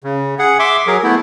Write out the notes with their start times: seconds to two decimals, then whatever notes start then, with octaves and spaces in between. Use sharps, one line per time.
0.04 C#3
0.39 G#4 F#5
0.59 E5 C6 D6
0.87 F#3 G#4 A#4
1.04 A3 B3 E4